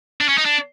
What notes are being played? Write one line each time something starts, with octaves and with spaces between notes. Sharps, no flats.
D4
C#4
D#4
D4